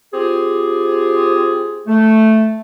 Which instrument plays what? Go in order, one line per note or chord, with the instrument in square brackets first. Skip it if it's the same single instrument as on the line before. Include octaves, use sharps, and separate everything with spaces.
[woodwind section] C4 F4 G4 G#4
A3